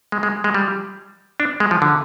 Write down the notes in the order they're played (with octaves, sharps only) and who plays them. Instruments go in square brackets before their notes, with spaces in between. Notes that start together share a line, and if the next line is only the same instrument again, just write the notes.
[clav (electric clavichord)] G#3
G#3
G#3
G3
D4
G#3
F3
D3